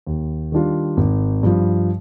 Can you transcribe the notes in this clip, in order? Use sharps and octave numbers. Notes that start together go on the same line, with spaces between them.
D#2
D#3 G3 D4 F4
G#1
G2 F3